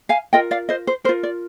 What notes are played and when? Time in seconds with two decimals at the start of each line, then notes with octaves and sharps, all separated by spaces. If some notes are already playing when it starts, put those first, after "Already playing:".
0.09 F5 G#5
0.33 F4 A#4 D#5 G5
0.51 D5 F5
0.69 C5 D#5
0.87 C5
1.04 A#4 C5
1.09 F4
1.23 D5